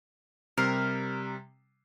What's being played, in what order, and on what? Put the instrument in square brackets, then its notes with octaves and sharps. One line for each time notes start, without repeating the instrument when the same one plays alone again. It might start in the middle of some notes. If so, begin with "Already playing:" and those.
[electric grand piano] C3 G3 C7 [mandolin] A#4